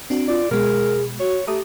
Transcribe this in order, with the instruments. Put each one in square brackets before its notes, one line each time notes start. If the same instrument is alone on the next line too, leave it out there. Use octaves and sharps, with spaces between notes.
[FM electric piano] C4 D4 F#4
[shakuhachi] F4 [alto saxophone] D5
[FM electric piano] B2 G#3 [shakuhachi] G#4 [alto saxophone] A#4
[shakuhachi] F#4 [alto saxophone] C#5
[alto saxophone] A3 [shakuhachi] G4 [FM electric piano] A#5 D6 D#6